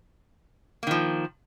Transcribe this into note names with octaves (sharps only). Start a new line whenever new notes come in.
D#3 F3 A#3